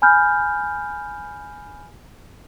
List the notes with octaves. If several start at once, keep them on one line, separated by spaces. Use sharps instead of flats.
G#5 B5 F6 G6